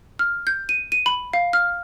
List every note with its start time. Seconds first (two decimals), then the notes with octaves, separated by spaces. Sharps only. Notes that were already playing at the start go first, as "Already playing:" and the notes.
0.19 F6
0.47 G6
0.69 D#7
0.92 D#7
1.06 B5
1.33 F5
1.53 F6